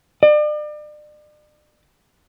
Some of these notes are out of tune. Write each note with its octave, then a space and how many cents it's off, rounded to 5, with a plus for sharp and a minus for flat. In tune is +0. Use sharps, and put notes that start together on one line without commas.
D5 +40